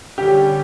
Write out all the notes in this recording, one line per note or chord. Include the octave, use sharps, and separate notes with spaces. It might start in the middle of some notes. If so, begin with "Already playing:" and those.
D3 G3 C#4 G4